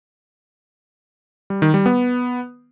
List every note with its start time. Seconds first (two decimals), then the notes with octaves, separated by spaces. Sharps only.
1.50 G3
1.62 D#3
1.74 G3
1.86 B3